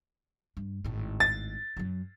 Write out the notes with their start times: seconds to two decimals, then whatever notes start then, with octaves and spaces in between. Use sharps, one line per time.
0.57 G2
0.85 G#1 A2
1.20 A6
1.77 F#2 F#3